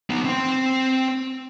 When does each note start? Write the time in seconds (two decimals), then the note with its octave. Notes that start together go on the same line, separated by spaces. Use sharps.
0.10 B3 D#4
0.25 C4 C6